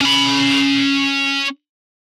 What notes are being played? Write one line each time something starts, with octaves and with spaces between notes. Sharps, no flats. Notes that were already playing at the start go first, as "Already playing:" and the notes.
C#4 B5